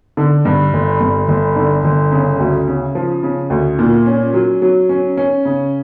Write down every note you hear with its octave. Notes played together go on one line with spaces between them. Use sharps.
D3
G2
G1
G2
G1
D3
G1
C#3
D2
C#3
F3
C#3
D2
A#2
C#4
F#3
F#3
C#4
C#4
C#3